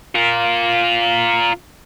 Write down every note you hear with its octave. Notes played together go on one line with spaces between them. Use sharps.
F4 A#4